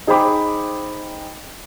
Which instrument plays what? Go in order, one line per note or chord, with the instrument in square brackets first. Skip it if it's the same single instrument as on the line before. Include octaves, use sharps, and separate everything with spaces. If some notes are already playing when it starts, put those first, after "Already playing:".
[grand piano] D#4 G#4 C5 G5 B5 D6